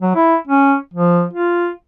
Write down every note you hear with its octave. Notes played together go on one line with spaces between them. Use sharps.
F#3
E4
C#4
F3
F4